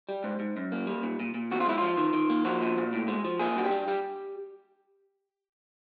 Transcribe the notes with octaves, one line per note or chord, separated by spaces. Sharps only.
G3
G#2
G#2
F#2
A#3
G3
A#2
A#2
A#2
E2 F#4
F4
G#3 E4
F3 F4
D#3
D#3
A#3
F3 F#4
A#2
A#2
A2
G#3
F3
A#3 G#4
G2 F#4
G4
G3
G3